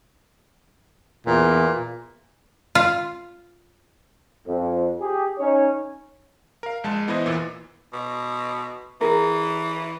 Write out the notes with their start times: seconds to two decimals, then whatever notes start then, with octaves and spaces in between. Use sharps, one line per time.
1.27 E2 A#2
2.75 F4
4.46 F2
5.00 G4 G#4
5.38 C#4 D#4 C#5
6.63 A#4 F5
6.84 A#1 G#3 A5
7.08 E3 B3 E4 B4 C5 D#5
7.26 E2 A#2 E3
7.93 B2
9.01 E3 G#4 A#4